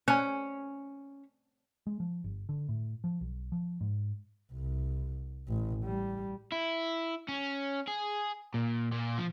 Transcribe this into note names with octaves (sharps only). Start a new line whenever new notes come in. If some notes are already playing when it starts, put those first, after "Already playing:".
C#4 G#5 F#6
G#3
F3
G1
D3
A2
F3
B1
F3
G#2
C2
A1
G3
E4
C#4
G#4
A#2
A#2
F3